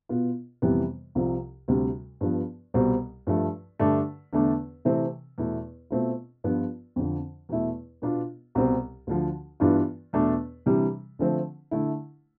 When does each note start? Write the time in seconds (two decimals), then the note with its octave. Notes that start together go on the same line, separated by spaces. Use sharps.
0.09 B2 B3 F4
0.62 F2 C3 E3 G3 B3
1.15 C2 C3 F3 C4 F4
1.68 D2 C3 G3
2.21 G2 F3 B3
2.74 C2 B2 G3 C4
3.27 G2 F3 A3
3.79 G2 D3 A3 D4
4.33 E2 D3 A3 D4
4.85 C3 E3 A3 C4
5.38 E2 B2 A3 E4
5.90 B2 A3 C4 F4
6.44 G2 F3 B3 F4
6.96 F2 D3 F3
7.49 E2 B2 A3 E4
8.02 B2 B3 D4 F4
8.55 C2 B2 G3 C4
9.07 D2 D3 F3
9.60 G2 E3 B3 D4 F4
10.13 E2 B2 A3 D4
10.66 C3 E3 G3 D4
11.19 D3 F3 A3 C4
11.71 D3 A3 E4